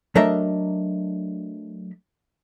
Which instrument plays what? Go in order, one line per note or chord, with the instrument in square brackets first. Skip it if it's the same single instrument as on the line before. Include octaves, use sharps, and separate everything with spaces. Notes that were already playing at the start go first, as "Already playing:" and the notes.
[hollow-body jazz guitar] F#3 A3 D4 A#4 D#5 E5